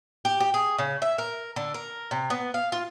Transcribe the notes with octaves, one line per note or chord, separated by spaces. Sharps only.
G4
G4
G#4
C#3
E5
A#4
D3
A#4
C3
B3
F5
F4